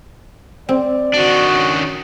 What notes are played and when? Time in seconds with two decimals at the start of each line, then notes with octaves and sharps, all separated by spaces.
0.69 C4 D5
1.14 D#3 D4 F#4
1.54 C#4